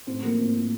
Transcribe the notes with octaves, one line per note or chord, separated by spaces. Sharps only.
A2 C4
F3 A#3
A2 C4
A2